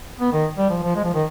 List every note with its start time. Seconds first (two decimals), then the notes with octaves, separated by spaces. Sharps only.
0.20 B3
0.33 D#3
0.57 G3
0.69 F3
0.83 F3
0.96 G#3
1.04 F3
1.14 D#3